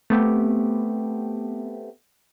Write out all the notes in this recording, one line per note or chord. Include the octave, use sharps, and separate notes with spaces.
A3 B3 C4 G4